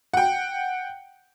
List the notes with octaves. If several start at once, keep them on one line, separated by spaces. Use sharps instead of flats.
F#5 G5